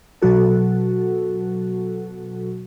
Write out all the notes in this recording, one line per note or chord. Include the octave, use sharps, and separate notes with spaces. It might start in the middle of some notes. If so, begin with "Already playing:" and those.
B2 F#3 F#4 A4